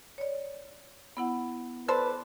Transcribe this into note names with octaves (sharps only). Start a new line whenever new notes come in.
C#5 D5
B3 E4 F#5
A4 B4 C5 D5